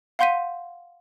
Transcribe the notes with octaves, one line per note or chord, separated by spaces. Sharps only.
F5 F#5 C6 G6 B6 D#7